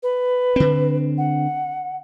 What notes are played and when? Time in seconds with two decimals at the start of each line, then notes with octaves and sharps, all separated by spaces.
0.03 B4
0.56 D3 C4
1.18 F#5